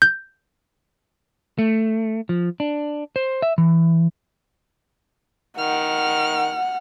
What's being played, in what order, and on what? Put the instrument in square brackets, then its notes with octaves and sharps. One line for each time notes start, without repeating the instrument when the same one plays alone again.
[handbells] G6
[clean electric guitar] A3
F3
D4
C5
E5
E3
[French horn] D#3 [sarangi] F#5 [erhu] F6